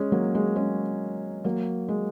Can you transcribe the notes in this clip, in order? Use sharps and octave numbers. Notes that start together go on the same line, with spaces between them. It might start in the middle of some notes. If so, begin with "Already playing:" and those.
Already playing: G#3 C#4
F#3 A#3
G#3
G#3 C#4
F#3 A#3
G#3